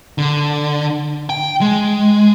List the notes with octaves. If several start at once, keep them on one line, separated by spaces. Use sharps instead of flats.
D3
G5
G#3